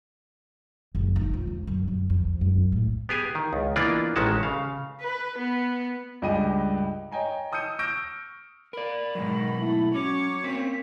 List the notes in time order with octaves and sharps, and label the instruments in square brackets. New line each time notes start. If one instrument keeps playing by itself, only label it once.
[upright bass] F#1
D#4
F2
C#3
F#2
F#2
F2
F#2
A2
[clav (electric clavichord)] B3 G4 G#4 G#5
D#3
C#2
E3 A#3 B3 D4 F4 D5
A1 D#3 G#3 C#4 F#4 A5
C#3 F5
[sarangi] B4
B3
[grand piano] C#2 G2 G4 D#5 G#5 D#7
C#5 D#5 G5 G#5 A#5
A5 D#6 E6 G6 C#7 D#7
C#6 E6 F6 G6 A#6 D7
[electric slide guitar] A#4 D5 [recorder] B5
[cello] G#2 D#3 [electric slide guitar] B2 F#3
[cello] A3 [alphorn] E4
[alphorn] F#3 [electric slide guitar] C#4 [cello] C#5 [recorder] D6
[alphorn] A#3 [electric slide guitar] C4 C#4 [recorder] B6